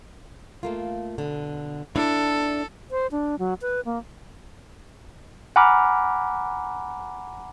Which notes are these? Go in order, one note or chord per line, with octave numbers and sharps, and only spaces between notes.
A3 A#3 F4
B2 D3
D4 E4 A4 D5
C5
D4
F#3
B4
A#3
F#5 G#5 A#5 B5 D6 F6